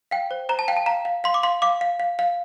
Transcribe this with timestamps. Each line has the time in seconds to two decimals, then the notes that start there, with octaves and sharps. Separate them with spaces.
0.11 F5 G5
0.31 C5
0.49 C5 A#5
0.59 A5
0.68 F5 G5
0.77 A5
0.86 F5 A#5
1.05 F5
1.24 F5 C6
1.34 D6
1.43 F5 C6
1.62 F5 D6
1.81 F5
2.00 F5
2.19 F5